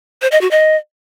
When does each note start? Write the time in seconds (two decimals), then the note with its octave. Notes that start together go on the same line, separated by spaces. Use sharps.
0.22 C5
0.32 D#5
0.41 F#4
0.51 D#5